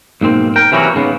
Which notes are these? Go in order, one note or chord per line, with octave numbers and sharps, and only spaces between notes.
B1 G#2 A#3 C4
A#4 G5
C3 E3 F#3 G3 A#3 F#4
G#2 C#3 B3